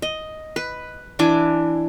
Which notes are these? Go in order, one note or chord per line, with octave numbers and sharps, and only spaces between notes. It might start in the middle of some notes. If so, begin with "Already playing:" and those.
D#5
B4
E3 D4 G#5 D6